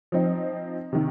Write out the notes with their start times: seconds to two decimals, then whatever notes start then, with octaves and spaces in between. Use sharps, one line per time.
0.12 F3 C4 D#4
0.93 C3 D#3